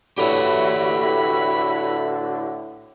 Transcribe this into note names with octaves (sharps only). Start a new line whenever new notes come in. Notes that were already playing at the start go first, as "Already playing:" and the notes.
A2 D3 E4 F#4 G4 B4 C#5 B5